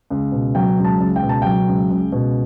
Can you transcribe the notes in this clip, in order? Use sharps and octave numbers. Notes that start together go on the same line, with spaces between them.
C#2
B2
F#3 G5
C#2
A5
C#2
G5
B2
A5
F#3 G5
C#2
C#2
B2